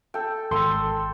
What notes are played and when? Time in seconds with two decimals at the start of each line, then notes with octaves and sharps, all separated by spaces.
0.14 A4 G5
0.51 G#1 A4 C6 E6